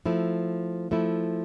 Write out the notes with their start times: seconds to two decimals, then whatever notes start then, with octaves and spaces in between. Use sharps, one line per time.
0.05 F3 A3 E4
0.91 F3 A3 E4